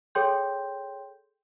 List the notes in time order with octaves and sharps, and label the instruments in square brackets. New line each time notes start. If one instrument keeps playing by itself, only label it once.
[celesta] G#4 A4 C#5 G5 C6 G6